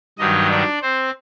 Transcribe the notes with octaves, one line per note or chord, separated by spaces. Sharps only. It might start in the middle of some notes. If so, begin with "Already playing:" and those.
G2 D#3 F#3 D#4 D#5
D4 D5
C4 C5